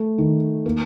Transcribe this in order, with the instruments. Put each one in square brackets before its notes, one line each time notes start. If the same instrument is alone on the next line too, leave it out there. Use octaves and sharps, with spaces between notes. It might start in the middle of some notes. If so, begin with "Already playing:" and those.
Already playing: [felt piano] A3
D#3
A#3